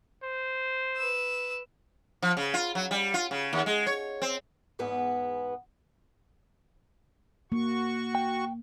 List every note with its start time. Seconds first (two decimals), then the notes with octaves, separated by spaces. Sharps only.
0.23 C5
0.97 B4 E6
2.23 F3
2.37 C#3
2.54 F4
2.75 F#3
2.91 G3
3.14 F4
3.31 C#3
3.53 D#2
3.66 G#3
3.87 C#5
4.22 C4
4.79 E2 G#2 B3 B4 G#5
7.52 A#3 F#4 C#6
8.15 G5